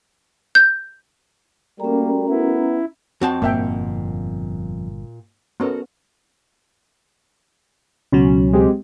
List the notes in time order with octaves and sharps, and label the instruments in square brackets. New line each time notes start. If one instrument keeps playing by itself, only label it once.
[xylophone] G6
[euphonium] G3 [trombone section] A3 F#4 A#4 [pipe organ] A#3 [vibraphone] C#4 A#5
[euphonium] B3 [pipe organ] E4
[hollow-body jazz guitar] F2 C4 A5 [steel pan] F#4
[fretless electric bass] G1 G2 [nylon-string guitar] A#2 F#5 [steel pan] A#3 E5 G5
[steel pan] B3 C#4 [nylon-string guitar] F#4 A4 A#4
[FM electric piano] C#2 B2 F#3 [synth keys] C#4
[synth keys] G#3 C4 G4